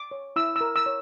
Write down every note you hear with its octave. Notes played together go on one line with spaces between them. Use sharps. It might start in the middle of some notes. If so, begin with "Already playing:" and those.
Already playing: D6
C#5
E4 E6
E6
A#4
E6
C#5